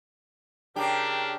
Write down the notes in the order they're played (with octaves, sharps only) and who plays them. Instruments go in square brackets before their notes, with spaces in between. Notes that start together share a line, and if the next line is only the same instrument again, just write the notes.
[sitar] C#3 G4 [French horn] D4 [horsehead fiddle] A#4 [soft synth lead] G5